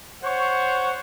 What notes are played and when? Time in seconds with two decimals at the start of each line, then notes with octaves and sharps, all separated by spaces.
0.23 C5 C#5 F#5 C#6